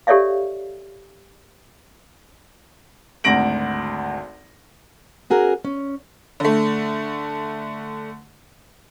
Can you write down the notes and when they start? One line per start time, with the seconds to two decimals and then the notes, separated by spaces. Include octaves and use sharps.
0.07 G4 A4 C#5 D5 E5 F5
3.24 G#1 D2 A#6 D7 F#7
5.30 C#4 F#4 G#4 A#4
5.65 C#4
6.40 D3 A3